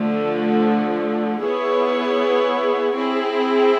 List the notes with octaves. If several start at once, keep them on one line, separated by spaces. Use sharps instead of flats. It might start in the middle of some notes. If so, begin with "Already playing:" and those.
Already playing: D3 F3 A3
B3 E4 G#4 C#5
C4 E4 G#4